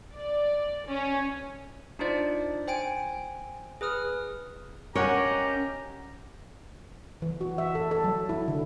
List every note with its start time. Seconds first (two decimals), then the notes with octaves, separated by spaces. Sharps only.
0.13 D5
0.86 C#4
1.99 D4 D#4 F4 C5 D5
2.68 C5 G5 G#5 D7
3.81 G#4 B4 D#6 F6
4.95 C#4 G4 A#4 C#5 D#5 F#5 A#5
7.22 E3
7.41 F#4
7.58 E5
7.75 A4
7.91 A4
8.04 F#3
8.29 E4
8.48 D3